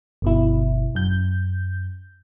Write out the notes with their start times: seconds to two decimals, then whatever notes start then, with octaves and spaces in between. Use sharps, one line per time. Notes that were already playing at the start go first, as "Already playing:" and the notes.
0.22 G1 B2 E4
0.95 F#2 G6